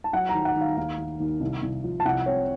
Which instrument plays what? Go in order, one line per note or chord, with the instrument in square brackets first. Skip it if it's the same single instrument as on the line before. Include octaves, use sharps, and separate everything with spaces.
[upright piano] A5
F#3 F#5
A#5
D#3
F#5
D#3
F5
D#2 F5
D#3
D#2
C2
C2
F3
A5
C2 F#5
C4 C#5